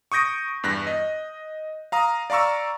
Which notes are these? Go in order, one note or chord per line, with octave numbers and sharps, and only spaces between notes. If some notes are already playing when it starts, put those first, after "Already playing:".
C#6 D#6 G6 A#6 D7
E2 G2 F#6 A#6
D#5
F5 A#5 D#6
D5 F5 A#5 C#6 E6